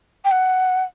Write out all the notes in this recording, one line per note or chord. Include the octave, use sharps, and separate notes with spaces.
G5
F#5